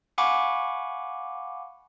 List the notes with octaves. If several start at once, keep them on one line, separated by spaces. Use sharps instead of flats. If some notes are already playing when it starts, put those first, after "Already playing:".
F5 F#5 G#5 B5 C#6 D6